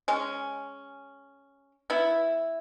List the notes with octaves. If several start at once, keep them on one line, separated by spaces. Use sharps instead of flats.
G#3 C#4
B3 E4